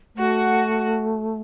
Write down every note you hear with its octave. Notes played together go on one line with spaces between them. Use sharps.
A3 F#4